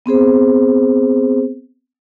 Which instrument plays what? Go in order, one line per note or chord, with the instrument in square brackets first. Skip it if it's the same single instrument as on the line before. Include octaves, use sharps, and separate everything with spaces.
[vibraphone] B3 C4 G#4 C5